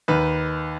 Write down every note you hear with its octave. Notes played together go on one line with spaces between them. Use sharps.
D#2 D#3 B4